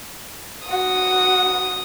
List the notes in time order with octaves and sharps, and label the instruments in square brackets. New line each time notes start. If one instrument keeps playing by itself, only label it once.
[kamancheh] F#4 [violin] D#6